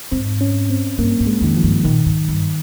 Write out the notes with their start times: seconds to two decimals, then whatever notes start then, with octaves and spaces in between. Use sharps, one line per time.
0.12 G#2 C4
0.41 C#4
0.70 C4
0.98 G2 A#3
1.20 G#2
1.27 G#3
1.41 F2 D#3
1.56 F3
1.63 G2
1.84 A#2 D#3
2.06 G#2
2.28 G2